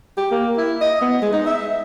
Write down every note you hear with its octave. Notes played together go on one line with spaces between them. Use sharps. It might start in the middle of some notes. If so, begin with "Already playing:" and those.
G4
A#3
E4
D#5
B3
G#3
D#4
E5